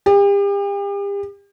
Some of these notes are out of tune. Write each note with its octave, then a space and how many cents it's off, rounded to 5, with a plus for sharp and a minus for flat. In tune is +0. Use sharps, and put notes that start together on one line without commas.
G4 +40